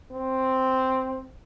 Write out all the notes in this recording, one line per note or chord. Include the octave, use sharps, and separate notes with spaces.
C4